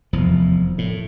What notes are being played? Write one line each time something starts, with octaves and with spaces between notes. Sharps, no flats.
F1 E2 F3
A2